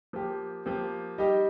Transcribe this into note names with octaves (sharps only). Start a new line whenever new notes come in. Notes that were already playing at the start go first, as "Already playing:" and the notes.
F3 A#3 G4
F3 A#3 G4
G3 D#4 G4